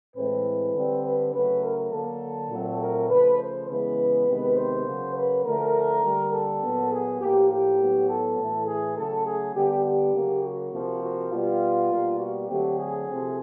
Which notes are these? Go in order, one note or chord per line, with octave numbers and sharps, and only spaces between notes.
A2 E3 G#3 C4 B4
D3 G3 C4
B4
C#3 F#3 A3 B4
A#4
D3 F#3 A#3 A4
A#2 F#3 A3 C4
A#4
C#3 F3 A3 B4
C5
C#3 E3 G#3 B3 B4
C3 D#3 G#3 B3
C5
C#3 F#3 A#3
B4
D3 F3 A3 A#4
D3 G3 A#3
A4
A#2 F#3 B3
G#4
A2 F3 A#3 G4
G4
A2 F#3 B3
A4
A2 E3 A3
G#4
C#3 F#3 A3 A4
G#4
D3 G3 B3 G4
G4
C#3 F#3 A#3
F#4
C3 F3 A#3
F#4
B2 G3 B3 F4
B2 G3 A#3
F#4
D3 F#3 A3 C4 G4
G#4
C3 F3 A3 C4